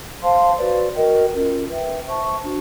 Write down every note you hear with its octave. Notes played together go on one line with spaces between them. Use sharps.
C5 F5 A5 C6
F#4 B4 D5
F#4 A#4 D#5 G5
C#4 F4 A#4
B4 E5 G5
C5 E5 A5 C#6
D4 F#4